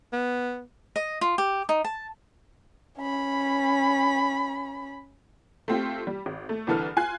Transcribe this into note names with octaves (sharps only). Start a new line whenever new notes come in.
B3
D#5
F4
G4
D#4
A5
C#4 B5
A3 C4 F4 G4
G3
G#1
A3
C2 D3 E3 A4 B4 F6
F4 G#5 F#6 C7